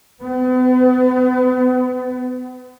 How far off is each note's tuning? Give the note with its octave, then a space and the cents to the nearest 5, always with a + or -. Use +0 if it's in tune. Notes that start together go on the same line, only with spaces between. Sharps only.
B3 +40